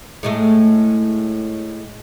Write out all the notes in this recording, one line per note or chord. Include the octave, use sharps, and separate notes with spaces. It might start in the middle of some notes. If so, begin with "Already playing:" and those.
A2 G#3 A3